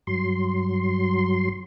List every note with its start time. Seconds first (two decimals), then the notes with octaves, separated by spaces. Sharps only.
0.07 G2 F#3 C6